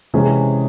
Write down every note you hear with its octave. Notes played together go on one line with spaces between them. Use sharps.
C3 E3 G#3 C#4 G#4